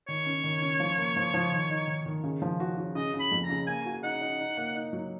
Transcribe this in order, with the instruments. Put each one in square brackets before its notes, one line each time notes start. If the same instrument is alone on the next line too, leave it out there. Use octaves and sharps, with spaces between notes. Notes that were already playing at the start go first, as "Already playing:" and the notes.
[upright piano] D#3 [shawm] C#5
[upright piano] C#4
D#3
C#4
F3
A#3
F3
F3
D#3
D#4
D#3
D#3
C#3
F3
F#4
F#4
[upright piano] C#3 [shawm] D#5
[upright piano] C#3
[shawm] B5
[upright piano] F2
[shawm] A#5
[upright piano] C#3
[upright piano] A#3 [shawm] G#5
[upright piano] F#4
[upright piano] D#4 [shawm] F#5
[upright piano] D#4
D#4
A#3
D#4
F#3